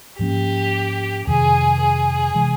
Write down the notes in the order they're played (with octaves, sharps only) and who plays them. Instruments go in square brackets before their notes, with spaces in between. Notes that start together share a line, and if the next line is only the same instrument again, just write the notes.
[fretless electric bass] G#2 F3 A#3 C#4 [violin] G4
[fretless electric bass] F2 C3 D#3 [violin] G#4
[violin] G#4
[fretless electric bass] C3 E3 G#3